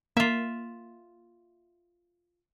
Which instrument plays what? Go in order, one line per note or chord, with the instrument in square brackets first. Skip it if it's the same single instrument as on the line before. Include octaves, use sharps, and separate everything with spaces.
[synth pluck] A#3 [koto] F4 E5